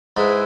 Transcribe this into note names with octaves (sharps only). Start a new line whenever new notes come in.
G#2 G#3 E4 G#4 B4 E5